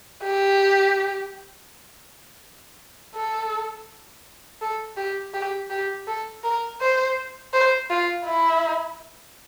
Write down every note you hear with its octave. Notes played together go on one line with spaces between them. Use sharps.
G4
A4
A4
G4
G4
G4
A4
A#4
C5
C5
F4
E4